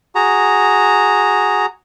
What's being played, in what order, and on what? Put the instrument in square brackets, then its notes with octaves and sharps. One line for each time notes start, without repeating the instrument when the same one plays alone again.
[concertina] F#4 G#4 A#5